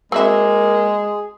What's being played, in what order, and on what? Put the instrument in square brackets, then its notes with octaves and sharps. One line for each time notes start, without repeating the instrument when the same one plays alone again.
[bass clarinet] G#3 [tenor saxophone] A#3 [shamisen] C4 F#4 E5 [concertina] G#4